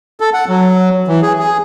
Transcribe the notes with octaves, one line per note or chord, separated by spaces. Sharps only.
A4
F#5
F#3
E3
G#4
G#4